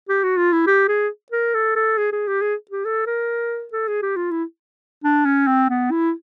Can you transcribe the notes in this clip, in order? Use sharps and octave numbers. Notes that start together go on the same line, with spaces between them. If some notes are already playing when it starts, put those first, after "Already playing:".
G4
F#4
F4
E4
G4
G#4
A#4
A4
A4
G#4
G#4
G4
G#4
G4
A4
A#4
A4
G#4
G4
F4
E4
D4
C#4
C4
B3
E4